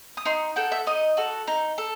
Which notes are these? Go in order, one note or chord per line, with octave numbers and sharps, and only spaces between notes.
D#6
D#4 C6
F#4 A4 G5
E5
D#4 D#5
F#4 A4
D#4
A4